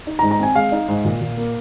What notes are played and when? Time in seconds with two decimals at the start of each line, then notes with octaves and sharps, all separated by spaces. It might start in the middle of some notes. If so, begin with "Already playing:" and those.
0.07 D#4
0.19 A#5
0.23 G#2
0.31 A#5
0.39 C4 G#5
0.55 G#3 F5
0.72 D#4
0.88 G#2
1.05 A#2
1.21 A#2
1.37 A#3